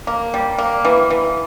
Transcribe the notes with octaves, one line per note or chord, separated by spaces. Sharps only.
A#3
G3
A#3
E3
E3